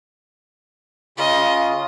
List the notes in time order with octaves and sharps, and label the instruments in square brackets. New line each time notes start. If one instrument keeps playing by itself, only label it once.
[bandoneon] C#3 F4 [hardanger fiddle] D#5